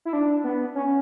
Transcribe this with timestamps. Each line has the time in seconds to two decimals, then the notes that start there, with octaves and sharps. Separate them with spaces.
0.05 E4
0.13 D4
0.44 B3
0.75 C#4